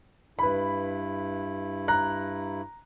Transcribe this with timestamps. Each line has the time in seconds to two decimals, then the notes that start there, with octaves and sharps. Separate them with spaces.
0.39 G2 E4 B4 B5
1.88 A#5 F#6